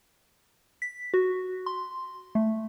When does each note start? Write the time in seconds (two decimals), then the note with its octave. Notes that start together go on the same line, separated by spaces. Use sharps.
0.82 B6
1.14 F#4
1.66 C6
2.35 A3